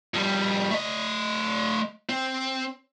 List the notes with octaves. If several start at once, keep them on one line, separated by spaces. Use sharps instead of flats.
F2 G3
A3 D#5
C4